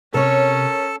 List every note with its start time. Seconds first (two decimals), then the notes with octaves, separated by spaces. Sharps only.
0.14 C3 C#4 A4 A#4 C#5 A5